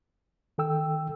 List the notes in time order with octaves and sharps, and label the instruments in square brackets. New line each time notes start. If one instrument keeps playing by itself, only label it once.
[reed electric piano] D#3 A4 G5 E6